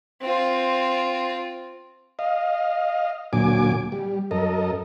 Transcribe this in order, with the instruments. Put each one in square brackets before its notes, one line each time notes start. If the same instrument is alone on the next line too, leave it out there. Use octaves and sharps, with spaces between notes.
[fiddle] C4 F4
[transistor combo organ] D#5 F5
D2 A#2 F#3 G#5 D6
G3
F#2 A4 A#4 D#5